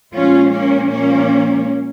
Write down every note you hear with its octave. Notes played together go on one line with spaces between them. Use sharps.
A#2 F3 G#3 C#4 F4
A#3 C#4
A#2 F3 G#3 A#3 C#4